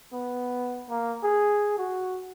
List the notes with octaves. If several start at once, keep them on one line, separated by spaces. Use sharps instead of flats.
B3
A#3
G#4
F#4